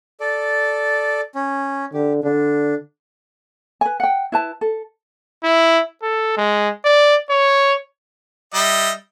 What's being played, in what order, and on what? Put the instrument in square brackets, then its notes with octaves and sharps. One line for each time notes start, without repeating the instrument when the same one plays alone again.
[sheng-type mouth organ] A4 D5
C#4
[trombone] D3 [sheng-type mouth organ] G4
[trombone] D3 [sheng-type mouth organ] D4
[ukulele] B4 G#5
F#5 G5
E4 B4 A5
A4
[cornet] E4
A4
G#3
D5
C#5
[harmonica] G3 D#5 E5